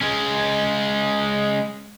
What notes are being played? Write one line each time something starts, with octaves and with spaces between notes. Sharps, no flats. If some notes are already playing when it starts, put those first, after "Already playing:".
G#3 C#4